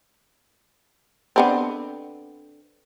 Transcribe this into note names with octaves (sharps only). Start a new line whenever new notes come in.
D3 B3 C4